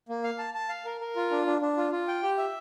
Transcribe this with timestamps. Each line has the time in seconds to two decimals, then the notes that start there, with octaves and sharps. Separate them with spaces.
0.09 A#3
0.24 F5
0.38 A5
0.54 A5
0.69 F5
0.85 A#4
1.01 A#4
1.16 F4
1.31 D4
1.47 D4
1.62 D4
1.77 F4
1.92 F4
2.08 G5
2.23 G4
2.38 E5